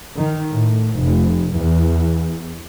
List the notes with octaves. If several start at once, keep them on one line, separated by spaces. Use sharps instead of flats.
D#3
A2
F1
E2